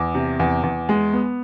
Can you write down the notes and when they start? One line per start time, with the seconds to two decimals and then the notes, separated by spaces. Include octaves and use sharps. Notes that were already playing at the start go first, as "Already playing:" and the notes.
Already playing: E2 D6
0.15 C3
0.39 E2
0.63 E2
0.89 G#3
1.13 B3